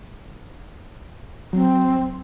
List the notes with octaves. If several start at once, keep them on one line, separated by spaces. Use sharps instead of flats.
F#3 C4